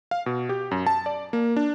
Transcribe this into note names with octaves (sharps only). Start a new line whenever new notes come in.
F5
B2
G4
F#2
A5
D5
A#3
D4